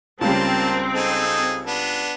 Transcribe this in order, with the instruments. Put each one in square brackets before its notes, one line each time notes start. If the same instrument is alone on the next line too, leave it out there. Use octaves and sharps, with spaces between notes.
[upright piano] C#2 C#3 G3 [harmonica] A#3 A5 [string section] C4
[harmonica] D#4 G#4 A4
B3 D4